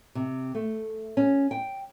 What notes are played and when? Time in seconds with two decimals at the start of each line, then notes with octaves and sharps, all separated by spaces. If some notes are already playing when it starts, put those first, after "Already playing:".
0.15 C3
0.55 A3
1.17 C#4
1.51 G5